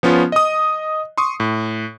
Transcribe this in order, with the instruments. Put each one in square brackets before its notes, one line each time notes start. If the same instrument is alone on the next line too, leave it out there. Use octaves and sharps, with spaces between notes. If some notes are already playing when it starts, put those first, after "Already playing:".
[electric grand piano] F3 B3 C#4 F4
D#5 D#6
C6 C#6 D#6
A2